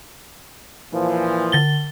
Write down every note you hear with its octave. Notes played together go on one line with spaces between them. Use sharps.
A#2 E3 F3
D3 A6 G7